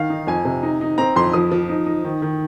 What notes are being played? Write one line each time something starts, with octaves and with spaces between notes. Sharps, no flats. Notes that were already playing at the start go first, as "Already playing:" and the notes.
Already playing: D#3 F5
D#4
F2 G#5
C3
D#4
D#4
C4 A#5
F2 C6
F3 D#6
F3
D#4
D#4
D#3
D#3